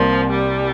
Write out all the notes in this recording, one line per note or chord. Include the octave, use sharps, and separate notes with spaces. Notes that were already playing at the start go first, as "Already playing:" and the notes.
Already playing: C2 C3 F3 A#3
G3